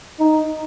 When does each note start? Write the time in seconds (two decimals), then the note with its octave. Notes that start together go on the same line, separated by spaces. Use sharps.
0.20 D#4